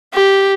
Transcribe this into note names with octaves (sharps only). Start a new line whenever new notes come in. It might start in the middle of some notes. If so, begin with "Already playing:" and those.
G4